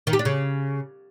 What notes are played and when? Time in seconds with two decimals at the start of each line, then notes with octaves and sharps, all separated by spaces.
0.07 D#3
0.13 G4
0.19 D4
0.25 C#3